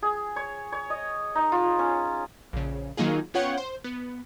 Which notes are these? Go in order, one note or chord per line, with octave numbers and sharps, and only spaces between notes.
G#4
C#5
C#5
D#5
D#4
F4
C#4
A#1 C#3
D#3 F#3 A#3 D#4 F4 G#4
B3 C#4 F4 C#5 F#5 G5
C5
B3